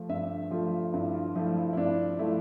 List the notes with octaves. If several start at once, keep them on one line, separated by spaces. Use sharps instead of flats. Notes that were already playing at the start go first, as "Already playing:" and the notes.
Already playing: F3 A3
G2 E5
F3 A3 F4
G2 E4
F4
F3 A3 E4
E4
E4
G2 D4
F3 A3 E4